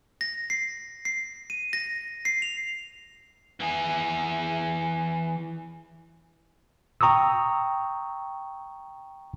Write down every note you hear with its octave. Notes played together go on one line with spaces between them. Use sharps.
A#6
C7
C7
D#7
A#6
C7
F7
E3 G#4
G5 A#5 C#6 D#6 E6